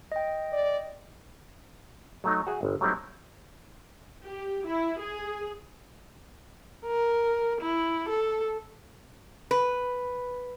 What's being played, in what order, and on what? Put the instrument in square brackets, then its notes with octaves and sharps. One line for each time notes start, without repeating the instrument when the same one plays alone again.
[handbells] D#5 G5
[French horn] D5
[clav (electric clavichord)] F#3 A3 D#4
F#4 G#4 E5
G1
F#3 G3 A3 C4 D#4 E4
[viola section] G4
E4
G#4
[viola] A#4
E4
A4
[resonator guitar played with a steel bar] B4